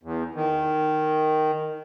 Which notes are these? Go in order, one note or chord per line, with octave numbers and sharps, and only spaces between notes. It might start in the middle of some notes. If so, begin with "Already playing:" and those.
E2
D#3